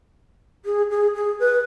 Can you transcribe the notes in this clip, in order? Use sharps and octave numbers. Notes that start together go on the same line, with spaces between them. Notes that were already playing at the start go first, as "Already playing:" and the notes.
G#4
G#4
G#4
B4